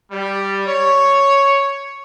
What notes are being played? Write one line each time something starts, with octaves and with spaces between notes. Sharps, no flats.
G3
C#5